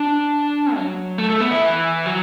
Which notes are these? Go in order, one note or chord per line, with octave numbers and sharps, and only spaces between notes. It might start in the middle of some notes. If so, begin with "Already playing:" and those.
Already playing: D4
F#3
A3
A3
B3
E4
E3
F#3